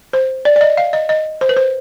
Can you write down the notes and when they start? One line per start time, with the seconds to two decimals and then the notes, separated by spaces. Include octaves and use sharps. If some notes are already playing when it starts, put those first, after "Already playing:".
0.13 C5
0.45 D5
0.56 D5
0.61 D#5
0.77 F5
0.93 D#5
1.09 D#5
1.41 C5
1.49 B4
1.57 C5